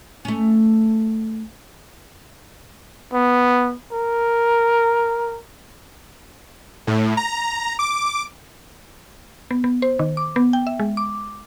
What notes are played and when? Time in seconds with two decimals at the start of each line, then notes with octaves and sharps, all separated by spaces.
0.25 A3 C#4
3.13 B3
3.92 A#4
6.87 A2
7.17 A#5
7.79 D6
9.51 B3
9.64 B3
9.82 C5
9.99 D#3
10.17 D6
10.36 B3
10.53 G5
10.67 E5
10.80 G#3
10.97 D6